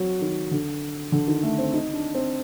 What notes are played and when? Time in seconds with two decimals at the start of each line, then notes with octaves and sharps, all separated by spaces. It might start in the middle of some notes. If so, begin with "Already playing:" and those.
Already playing: F#3 C4
0.21 D#3
0.51 D3
1.12 D3
1.28 D#3
1.43 A3
1.58 C4
1.73 D#4
1.93 D4
2.15 C4